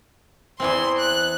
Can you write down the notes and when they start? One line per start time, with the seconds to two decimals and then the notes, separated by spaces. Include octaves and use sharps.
0.60 E2 E3 C4 C6
0.98 F#6